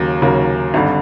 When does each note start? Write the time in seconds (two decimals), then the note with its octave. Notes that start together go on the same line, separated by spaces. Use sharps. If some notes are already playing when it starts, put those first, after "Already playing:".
Already playing: D#2 C#3 F#3 A#3
0.22 D#2 C#3 F#3 A#3
0.74 G#1 G2 D3